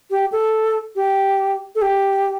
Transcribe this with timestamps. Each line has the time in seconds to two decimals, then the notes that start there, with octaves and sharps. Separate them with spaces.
0.11 G4
0.32 A4
0.96 G4
1.76 A4
1.82 G4